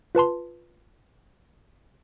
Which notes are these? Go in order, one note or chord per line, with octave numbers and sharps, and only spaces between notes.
F4 B4 A5 C6